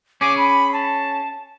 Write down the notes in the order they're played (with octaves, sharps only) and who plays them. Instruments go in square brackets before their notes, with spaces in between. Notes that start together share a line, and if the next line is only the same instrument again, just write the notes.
[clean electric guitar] C#4 G#4 [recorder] D6
[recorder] B5
A5